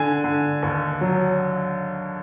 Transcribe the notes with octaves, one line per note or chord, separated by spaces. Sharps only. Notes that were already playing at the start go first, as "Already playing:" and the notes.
Already playing: D3 G#5
D3
D#2
F#3